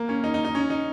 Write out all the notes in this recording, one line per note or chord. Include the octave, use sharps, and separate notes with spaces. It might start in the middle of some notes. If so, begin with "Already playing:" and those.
Already playing: A#3
C#4
D#4
D#4
D#4
C#4
D#4